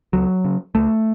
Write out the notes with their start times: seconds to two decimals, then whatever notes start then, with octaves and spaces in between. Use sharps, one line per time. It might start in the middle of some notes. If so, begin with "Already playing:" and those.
0.13 C#2 F#3
0.45 C#3
0.75 C#2 A3